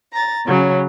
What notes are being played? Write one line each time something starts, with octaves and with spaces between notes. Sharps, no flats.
A#5 A6
C#3 F#3 C#4